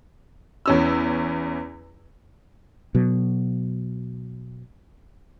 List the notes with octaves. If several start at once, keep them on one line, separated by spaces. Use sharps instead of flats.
E2 C#4 E6
B2 F#3